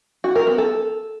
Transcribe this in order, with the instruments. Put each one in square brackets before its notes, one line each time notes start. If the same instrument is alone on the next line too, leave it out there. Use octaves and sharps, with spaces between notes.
[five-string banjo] F#4
A#4
B3
A4